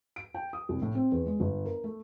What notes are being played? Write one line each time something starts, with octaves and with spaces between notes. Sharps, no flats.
D7
G5
D#6
C2
A2
C4
E2
G#3
G1
A#4
A3